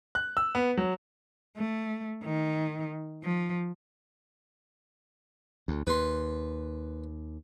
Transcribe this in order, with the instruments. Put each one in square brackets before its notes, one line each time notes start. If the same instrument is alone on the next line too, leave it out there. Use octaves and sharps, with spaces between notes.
[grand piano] F#6
E6
B3
F#3
[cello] A3
D#3
F3
[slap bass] D2
[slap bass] D#2 [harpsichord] B4 C6